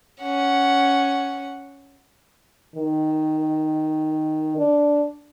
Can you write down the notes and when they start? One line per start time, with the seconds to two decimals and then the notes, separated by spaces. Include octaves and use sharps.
0.22 C#4 F#5
2.76 D#3
4.57 D4